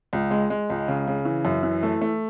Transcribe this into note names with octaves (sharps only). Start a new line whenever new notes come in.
C#2
G#3
G#3
C#2
C#3
C#3
E3
F#2
E3
A3
A3